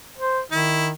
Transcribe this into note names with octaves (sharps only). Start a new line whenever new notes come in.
C5
D#3 E4